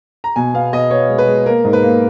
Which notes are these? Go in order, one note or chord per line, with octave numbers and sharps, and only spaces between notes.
A#5
B2 G#5
B3 F5
B2 D#5
B3 C#5
G#3
B4
G#3
A#3 A#4
G#2
B4
A#3